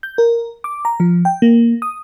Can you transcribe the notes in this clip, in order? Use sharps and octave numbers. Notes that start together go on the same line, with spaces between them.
G6
A#4
D6
A#5
F3
G5
A#3
D#6